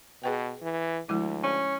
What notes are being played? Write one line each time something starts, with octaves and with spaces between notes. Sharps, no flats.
B2 G#4 B4 G5
E3
D2 F3 G#3 E4
C#4